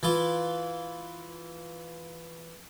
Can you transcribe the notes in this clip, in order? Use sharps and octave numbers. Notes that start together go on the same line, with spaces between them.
E3 F4